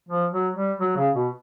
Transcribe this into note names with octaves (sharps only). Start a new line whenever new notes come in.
F3
F#3
G3
F#3
C#3
B2